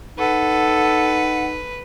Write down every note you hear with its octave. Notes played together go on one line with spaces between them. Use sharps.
D#4 A4 B4 F#5